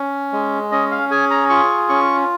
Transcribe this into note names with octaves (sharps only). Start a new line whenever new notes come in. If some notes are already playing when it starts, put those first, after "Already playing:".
Already playing: C#4
G#3
C#4 D#5
F5
G#4 G#5
A#5
F4 C#6
C#4 C#6